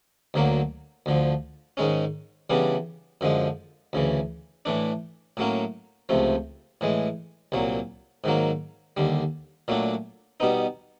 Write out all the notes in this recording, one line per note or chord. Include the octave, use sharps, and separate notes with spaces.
D2 D3 F#3 A#3
D2 D3 F3
G#2 D#3 G#3 C#4
C#3 E3 G3 B3 D4
F#2 D3 F3 G#3
D2 C#3 E3
A2 E3 A3 D4
A2 F#3 A#3 C#4
C#2 C3 F3 A3
A2 E3 G#3
C2 A#2 F#3
G#2 D#3 F#3 A#3
D#2 D3 G3
A#2 F#3 A3 D4
B2 G3 B3 D#4